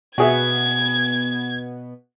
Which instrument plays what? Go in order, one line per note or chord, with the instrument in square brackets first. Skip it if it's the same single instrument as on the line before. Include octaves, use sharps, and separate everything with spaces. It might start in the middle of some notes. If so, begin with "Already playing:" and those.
[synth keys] B2 B3 [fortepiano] F#4 G#4 E5 [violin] G#6